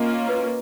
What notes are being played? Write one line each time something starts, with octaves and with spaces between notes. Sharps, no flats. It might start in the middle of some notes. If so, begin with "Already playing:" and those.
Already playing: A#3 C#4 F4 D#5 F5
B4